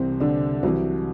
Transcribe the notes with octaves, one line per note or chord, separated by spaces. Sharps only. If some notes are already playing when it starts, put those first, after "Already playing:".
Already playing: C2 C3 E3 C4
D3 D4
C2 C3 E3 F#3